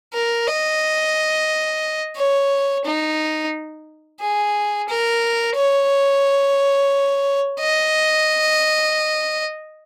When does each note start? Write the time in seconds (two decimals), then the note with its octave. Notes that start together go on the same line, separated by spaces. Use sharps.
0.14 A#4
0.47 D#5
2.17 C#5
2.85 D#4
4.21 G#4
4.89 A#4
5.56 C#5
7.60 D#5